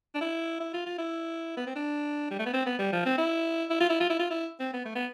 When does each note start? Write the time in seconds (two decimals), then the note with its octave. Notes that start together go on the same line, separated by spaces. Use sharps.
0.15 D4
0.21 E4
0.60 E4
0.73 F4
0.86 F4
0.98 E4
1.57 B3
1.67 C4
1.76 D4
2.31 G3
2.39 A3
2.46 B3
2.53 C4
2.66 B3
2.79 G3
2.93 F3
3.05 C4
3.18 E4
3.70 E4
3.80 F4
3.90 E4
4.00 F4
4.10 E4
4.20 F4
4.31 E4
4.60 C4
4.73 B3
4.85 A3
4.96 B3